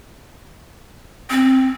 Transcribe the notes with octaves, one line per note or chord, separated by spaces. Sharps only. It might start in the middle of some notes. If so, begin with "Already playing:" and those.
C4